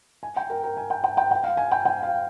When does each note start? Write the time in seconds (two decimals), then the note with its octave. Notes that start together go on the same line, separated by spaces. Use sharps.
0.23 G#5
0.36 G5
0.50 A#4
0.63 A#4
0.77 G#5
0.90 G5
1.04 G5
1.17 G5
1.31 G5
1.44 F5
1.57 G#5
1.71 G5
1.85 G5
2.03 F5